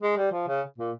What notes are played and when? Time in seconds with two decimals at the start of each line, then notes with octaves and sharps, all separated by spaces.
0.02 G#3
0.17 G3
0.32 F3
0.48 C#3
0.78 A#2